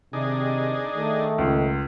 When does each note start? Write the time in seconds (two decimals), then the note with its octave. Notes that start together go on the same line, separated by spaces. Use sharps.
0.13 C3 D#3 D4 D#4 G#4
0.96 D#3 A3
1.38 C#2